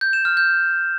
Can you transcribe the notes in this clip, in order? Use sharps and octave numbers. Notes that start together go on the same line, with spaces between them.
G6
E7
F6
G6